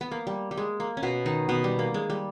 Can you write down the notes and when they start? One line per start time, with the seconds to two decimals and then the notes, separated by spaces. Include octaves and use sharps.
0.01 B3
0.11 A#3
0.27 G3
0.51 G3
0.57 G#3
0.80 A#3
0.97 C#4
1.03 B2 B3
1.26 D#3 D#4
1.49 B2 B3
1.64 G3
1.79 A#3
1.94 G#3
2.10 G3